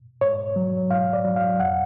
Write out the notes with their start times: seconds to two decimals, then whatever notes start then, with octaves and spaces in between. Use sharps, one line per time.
0.21 G#2 C#5
0.56 F#3
0.91 G#2 F5
1.13 D5
1.25 F#3
1.36 F5
1.60 F2 F#5